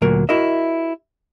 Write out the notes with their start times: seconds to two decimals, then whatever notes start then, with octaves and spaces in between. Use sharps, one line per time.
0.02 D2 A#2 F#3 A#4
0.29 E4 F#4 A#4 D#5 E5